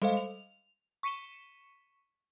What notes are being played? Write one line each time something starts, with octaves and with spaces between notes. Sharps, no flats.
G3 G#3 A4 C5 D#5 F5
F7
C#6 B6 C#7 D#7 E7 G7